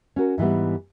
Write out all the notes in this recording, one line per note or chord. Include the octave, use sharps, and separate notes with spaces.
C#4 F#4 A#4
G#2 E3 G3 B3